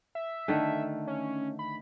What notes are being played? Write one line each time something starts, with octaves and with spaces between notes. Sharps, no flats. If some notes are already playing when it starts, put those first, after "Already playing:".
E5
D3 D#3 A3
C#4
B5